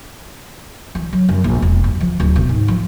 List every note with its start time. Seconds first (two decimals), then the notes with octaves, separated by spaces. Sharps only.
0.95 E3
1.13 F#3
1.29 F#2
1.44 A#1
1.62 E1
1.84 G2
2.01 F3
2.20 D1
2.36 B2
2.49 G#2
2.68 F3